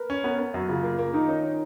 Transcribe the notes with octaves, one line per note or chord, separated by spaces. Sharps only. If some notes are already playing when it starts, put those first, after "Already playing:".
Already playing: A#4 B4
C#4
B3 A#4
B3 A#4
F#2 F#4
C#3 F4
A#3
A#3
D#3 D#4
C#4 D#4